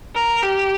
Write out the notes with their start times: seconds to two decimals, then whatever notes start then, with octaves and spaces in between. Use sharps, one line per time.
0.15 A#4
0.43 G4